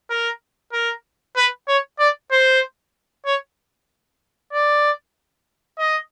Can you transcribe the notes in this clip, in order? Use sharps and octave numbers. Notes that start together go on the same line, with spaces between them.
A#4
A#4
B4
C#5
D5
C5
C#5
D5
D#5